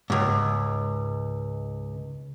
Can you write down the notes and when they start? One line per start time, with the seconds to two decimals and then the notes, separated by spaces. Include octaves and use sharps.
0.10 C#2 G#2